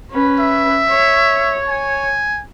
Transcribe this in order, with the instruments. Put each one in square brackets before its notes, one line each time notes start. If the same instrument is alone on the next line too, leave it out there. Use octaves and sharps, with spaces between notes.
[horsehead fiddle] C#4 B4
[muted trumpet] E5
[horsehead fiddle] C#5
[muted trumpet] G#5